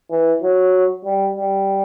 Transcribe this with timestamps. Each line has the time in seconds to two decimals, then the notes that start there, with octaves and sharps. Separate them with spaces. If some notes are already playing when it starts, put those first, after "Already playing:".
0.11 E3
0.42 F#3
1.05 G3
1.36 G3